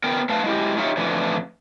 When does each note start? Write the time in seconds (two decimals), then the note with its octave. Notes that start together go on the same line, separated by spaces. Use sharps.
0.04 B3 A#4 G5
0.29 A3 B4 F5 A5
0.44 G#3 E4 G4
0.77 D#4 F4 G4 C#5 E5
0.97 F2 A2 D3 E3